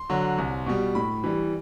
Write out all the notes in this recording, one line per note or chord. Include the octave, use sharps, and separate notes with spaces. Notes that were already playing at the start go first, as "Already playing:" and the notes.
Already playing: C6
D3 F#3
C2
B2 G3
A2 B5
E3 G3